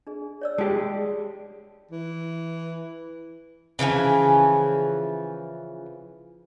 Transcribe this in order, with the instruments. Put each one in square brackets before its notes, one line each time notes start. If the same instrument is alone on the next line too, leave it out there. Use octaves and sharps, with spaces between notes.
[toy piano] D4 G#4
C#5 D5 E6
[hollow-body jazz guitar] G#3 G4 [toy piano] A5
[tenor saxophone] E3
[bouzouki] C#3 E3 F3 G#5